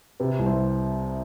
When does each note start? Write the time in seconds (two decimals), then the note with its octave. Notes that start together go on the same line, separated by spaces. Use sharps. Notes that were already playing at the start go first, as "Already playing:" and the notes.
0.20 C3 B4
0.39 C2
0.46 C5